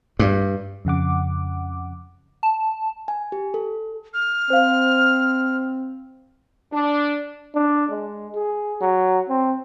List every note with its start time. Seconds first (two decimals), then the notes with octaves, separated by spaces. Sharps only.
0.19 G2
0.85 F2 C#3 F#5 D6
2.43 A5
3.08 G#5
3.32 G4
3.54 A4
4.14 F6
4.50 C4 C5 F5
6.73 D4
7.55 D4
7.90 G#3
8.34 G#4
8.81 F#3
9.29 C4